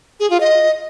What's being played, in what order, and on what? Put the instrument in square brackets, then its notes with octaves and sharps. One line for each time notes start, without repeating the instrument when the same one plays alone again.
[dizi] G#4
F4
D#5